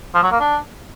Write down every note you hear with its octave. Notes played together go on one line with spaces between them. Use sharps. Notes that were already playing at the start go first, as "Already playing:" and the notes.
F3
F#3
A#3
D4